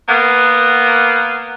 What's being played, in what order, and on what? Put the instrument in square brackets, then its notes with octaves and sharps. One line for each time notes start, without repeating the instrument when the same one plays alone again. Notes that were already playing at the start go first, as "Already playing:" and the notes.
[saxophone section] A#3 B3